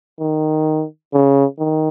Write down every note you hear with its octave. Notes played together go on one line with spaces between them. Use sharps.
D#3
C#3
D#3